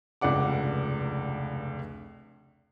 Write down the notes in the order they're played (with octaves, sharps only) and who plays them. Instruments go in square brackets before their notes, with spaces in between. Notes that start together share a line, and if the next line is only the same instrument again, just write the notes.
[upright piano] F1 C#2 G2 D5 F#5 D6